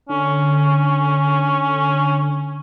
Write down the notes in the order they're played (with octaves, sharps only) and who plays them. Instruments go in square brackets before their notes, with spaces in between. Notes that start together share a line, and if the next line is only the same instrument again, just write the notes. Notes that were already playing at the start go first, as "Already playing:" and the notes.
[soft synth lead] D3 [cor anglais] C#4